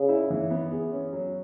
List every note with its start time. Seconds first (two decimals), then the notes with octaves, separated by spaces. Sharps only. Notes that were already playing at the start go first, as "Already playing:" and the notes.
Already playing: C#3 G#4
0.09 E4
0.30 E3
0.50 B3
0.71 G#4
0.92 C#4
1.13 F#3